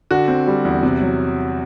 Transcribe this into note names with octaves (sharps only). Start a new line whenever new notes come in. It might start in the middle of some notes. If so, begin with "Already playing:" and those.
D3 F#4
C4
G3
E2
C3
F#3